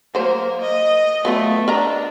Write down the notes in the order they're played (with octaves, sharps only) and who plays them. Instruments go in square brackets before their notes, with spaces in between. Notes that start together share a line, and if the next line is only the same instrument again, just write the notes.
[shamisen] F#3 C5 [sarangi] A#3
[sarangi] D#5
[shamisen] F#3 B3 F4 [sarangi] A3
[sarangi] D4 [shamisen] A#4 D#5 A#5